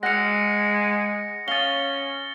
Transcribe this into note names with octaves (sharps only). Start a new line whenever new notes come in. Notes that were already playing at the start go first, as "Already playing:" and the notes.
G#3 F#5 E6 F6 A#6 C#7
C#4 F5 D#6 A6 G7